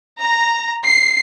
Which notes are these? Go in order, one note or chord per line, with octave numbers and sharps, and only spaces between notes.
A#5
C7